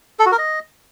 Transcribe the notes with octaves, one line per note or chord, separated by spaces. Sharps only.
A4
F#4
A#4
D#5